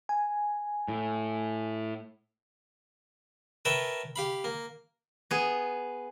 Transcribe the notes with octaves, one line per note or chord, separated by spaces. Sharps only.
G#5
A2
A#4 B4 C#5 E5 G5 A5
G4 F5 B5
A#3
B3 G#4